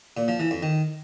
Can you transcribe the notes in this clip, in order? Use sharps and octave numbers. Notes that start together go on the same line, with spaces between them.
A#2
F3
E3
F2
D#3